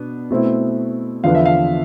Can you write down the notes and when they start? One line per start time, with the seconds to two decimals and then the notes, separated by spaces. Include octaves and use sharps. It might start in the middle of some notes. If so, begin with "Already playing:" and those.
Already playing: B2 B3 D4
0.30 B2 A3 C4 E4
1.24 E2 D3 F3 B3 D4 F5
1.35 E5
1.46 F5